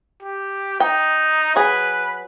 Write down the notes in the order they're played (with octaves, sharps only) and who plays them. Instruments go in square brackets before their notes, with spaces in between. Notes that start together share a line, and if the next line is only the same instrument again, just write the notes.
[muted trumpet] G4
[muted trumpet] D#4 [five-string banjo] G5
[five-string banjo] F#3 G#4 [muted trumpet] B4